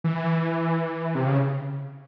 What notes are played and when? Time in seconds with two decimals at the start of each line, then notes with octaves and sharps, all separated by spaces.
0.04 E3
1.15 C3
1.26 C#3